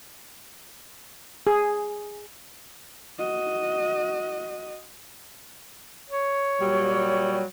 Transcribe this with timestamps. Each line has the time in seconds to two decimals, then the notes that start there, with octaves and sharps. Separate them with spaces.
1.47 G#4
3.19 F#4 D#5
6.10 C#5
6.61 A#2 F#3 G3